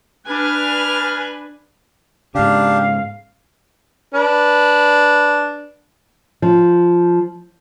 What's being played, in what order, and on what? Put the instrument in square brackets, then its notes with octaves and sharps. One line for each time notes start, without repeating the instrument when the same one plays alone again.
[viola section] D4 B4 G#5 [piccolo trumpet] F6
[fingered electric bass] G#2 C#3 [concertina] D4 G4 [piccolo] F5
[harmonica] D4 B4
[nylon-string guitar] F3